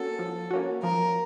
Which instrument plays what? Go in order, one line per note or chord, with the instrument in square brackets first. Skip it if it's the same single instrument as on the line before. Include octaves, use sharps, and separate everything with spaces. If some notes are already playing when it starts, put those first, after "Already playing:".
Already playing: [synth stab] A#3 C#4 F#4 [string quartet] A4
[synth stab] F3
A#3 C#4 F#4
[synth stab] F3 [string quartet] A#4